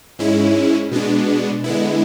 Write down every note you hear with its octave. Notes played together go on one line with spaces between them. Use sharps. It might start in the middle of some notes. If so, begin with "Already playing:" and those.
G#2 G#3 C#4 E4
B2 G#3 B3 D4
D3 G#3 B3 E4